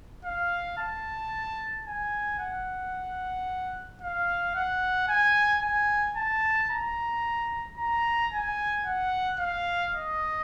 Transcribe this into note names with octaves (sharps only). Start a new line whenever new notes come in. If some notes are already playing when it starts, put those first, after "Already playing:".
F5
A5
G#5
F#5
F5
F#5
G#5
G#5
A5
A#5
A#5
G#5
F#5
F5
D#5